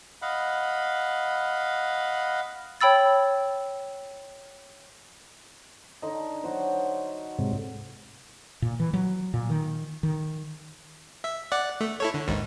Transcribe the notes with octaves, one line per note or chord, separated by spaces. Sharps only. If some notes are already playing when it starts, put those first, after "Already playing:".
D#5 F5 F#5 B5
C#5 G5 B5 E6 A6
D3 D#4 C6
F#3 F#4 C5
G#2 C3
A#2
E3
F#3
A#2
D#3
D#3
E5
D5 F#5
A3
E4 A4 C#5
D3
A1 D#2 G#2